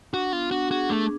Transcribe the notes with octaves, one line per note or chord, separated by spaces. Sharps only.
D4 F#4
B3 F4
D4 F#4
F#4 G#4
A3 D4